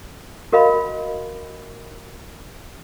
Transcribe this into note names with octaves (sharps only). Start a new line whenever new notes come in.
F#4 A#4 D#5 F5 B5